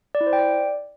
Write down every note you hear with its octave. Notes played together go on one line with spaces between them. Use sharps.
D5
E4
C5
G5
D5